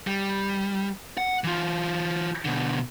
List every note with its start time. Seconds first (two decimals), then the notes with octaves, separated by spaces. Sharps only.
0.07 G3
1.18 F#5
1.44 E3 F4
2.45 B2 D3